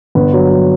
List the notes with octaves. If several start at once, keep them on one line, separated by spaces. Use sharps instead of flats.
G1 B4
F#3
F#3